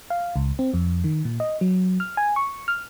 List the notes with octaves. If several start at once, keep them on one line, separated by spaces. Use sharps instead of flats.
F5
C#2
C4
F2
D#3
A#2
D#5
F#3
F6
G#5
C#6
F6